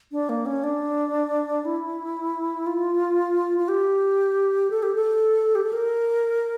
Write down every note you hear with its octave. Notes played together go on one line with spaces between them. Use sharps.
D4
A#3
C#4
D4
E4
F4
F4
G4
A4
G4
A4
G4
A4
A#4